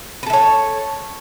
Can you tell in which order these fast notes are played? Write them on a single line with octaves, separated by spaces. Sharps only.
B4 A4 E5 C#5